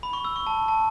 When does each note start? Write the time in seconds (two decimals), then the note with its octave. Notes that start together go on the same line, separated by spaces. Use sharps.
0.03 B5
0.13 C#6
0.25 E6
0.36 C#6
0.47 A5
0.68 A5